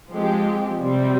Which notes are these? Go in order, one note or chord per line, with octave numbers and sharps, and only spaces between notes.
F3 G#3 C4 G4
C3 G3 C4